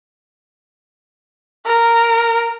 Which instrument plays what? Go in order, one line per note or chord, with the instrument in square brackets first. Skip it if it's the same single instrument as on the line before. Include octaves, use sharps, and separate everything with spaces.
[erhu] A#4